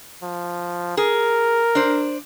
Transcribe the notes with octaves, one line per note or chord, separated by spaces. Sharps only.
F3
G#4 A#4
D4 C5